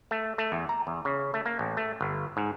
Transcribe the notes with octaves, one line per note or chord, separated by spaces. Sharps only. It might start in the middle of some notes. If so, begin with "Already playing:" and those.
A3
A3
E2
A#5
E2
C#3
A3
A#3
A1
A3
G1
G#2